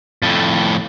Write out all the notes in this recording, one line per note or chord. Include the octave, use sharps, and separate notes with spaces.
F2 A2